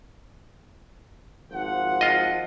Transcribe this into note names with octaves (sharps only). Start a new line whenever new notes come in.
G#1 F3 F#5
F4 D#5